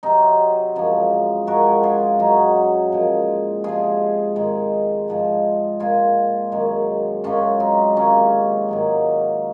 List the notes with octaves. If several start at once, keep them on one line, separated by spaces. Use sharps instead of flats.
C3 F#3 C4 D#4
F#2 F3 G#3
F#2 F3 G#3 F#4 A#4
F4 G#4
F#2 C#3 F#3 D#4 F#4
A#2 F3 G#3
C3 F3 G#3 F4 G#4
G#2 D#3 G#3
G#2 F3 G#3
A#2 G#3 F4 G#4
F#2 D#3 G#3
F#2 C#3 G#3 C#4 F4
C4 D#4
C3 D#3 G#3 A#3 C#4
G#2 D#3 F#3